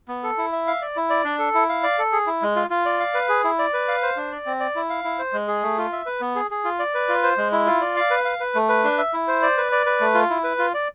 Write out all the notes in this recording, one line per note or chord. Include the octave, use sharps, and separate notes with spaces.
B3
A4
E4
E5
F5
D5
E4
D5
D4
A4
E4
F5
D5
A4
G#4
E4
G#3
F4
F4
D5
F5
B4
G#4
E4
D5
B4
F5
C5
D4
D5
C4
D5
E4
F5
E4
C5
G#3
G#4
A3
F4
E5
B4
B3
G#4
G#4
F4
D5
B4
F4
C5
G#3
E4
F4
D5
F5
B4
F5
B4
A3
B4
D4
E5
E4
C5
D5
B4
D5
B4
A3
F4
E4
B4
F4
D5